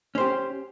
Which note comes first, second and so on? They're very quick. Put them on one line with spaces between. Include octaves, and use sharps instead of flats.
C#4 C5 G4